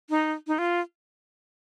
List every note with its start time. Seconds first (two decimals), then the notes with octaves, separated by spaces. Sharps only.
0.10 D#4
0.47 D#4
0.59 F4